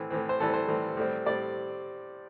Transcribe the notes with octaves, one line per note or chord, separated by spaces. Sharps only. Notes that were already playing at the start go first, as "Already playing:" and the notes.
Already playing: A2 E3 C4
A2 E3 C4
C5
A2 E3 G3 C4 A4
C5
A2 E3 G3 C4
A2 G3 C4
A2 G3 C4 D5